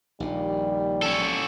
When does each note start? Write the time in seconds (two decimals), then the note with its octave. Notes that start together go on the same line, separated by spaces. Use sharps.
0.20 A#1 D#2 A#2 G3
1.02 C#4 A4